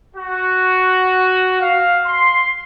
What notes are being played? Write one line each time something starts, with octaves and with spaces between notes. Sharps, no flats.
F#4
F5
C6